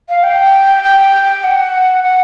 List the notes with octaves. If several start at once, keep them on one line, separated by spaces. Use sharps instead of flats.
F5
G5
G5
F#5
F#5